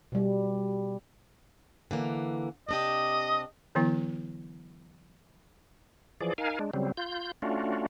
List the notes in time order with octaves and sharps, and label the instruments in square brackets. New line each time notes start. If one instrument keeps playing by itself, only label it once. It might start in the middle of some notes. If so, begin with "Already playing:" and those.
[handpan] B2 G3
[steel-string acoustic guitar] D3 E3 A#3
[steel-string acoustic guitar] C3 D4 G4 [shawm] D#5
[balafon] D3 E3 F#3 B3 E4
[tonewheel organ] E3 F3 G#4 D5
D#4 A#4 F5 G#5
G#3 D4
C#3 F#3 G3 C4
F4 G6
A3 C#4 D4 F4 F#4